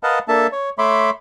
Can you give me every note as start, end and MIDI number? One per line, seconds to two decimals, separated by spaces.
0.03 0.19 70
0.03 0.19 71
0.03 0.19 75
0.03 0.19 77
0.03 0.19 78
0.03 0.19 81
0.28 0.47 58
0.28 0.47 62
0.28 0.47 69
0.28 0.47 76
0.28 0.47 81
0.52 0.70 73
0.78 1.10 57
0.78 1.10 73
0.78 1.10 76
0.78 1.10 83
0.78 1.10 84
0.78 1.10 86